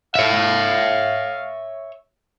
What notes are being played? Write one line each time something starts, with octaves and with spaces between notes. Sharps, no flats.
C#5 E5 F5